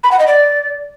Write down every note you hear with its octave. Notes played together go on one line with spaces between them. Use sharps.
B5
F#5
D#5
D5